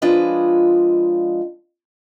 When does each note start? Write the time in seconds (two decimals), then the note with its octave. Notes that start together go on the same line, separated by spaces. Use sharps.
0.02 F3 G#3 D4 F4 B4 D#5